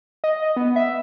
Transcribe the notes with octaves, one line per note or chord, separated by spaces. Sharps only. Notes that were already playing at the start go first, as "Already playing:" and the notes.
D#5
B3
E5